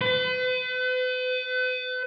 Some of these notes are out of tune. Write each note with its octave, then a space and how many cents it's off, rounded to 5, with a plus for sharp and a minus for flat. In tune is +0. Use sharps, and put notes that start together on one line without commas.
B4 +40